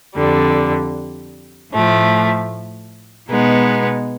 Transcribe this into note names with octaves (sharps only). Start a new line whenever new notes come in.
F2 D3 G3
A2 F3 A3
B2 G#3 B3 D#4